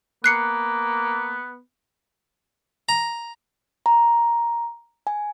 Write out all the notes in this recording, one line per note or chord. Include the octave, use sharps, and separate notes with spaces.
A#3 B3 F#6 C7 C#7
A#5
A#5
G#5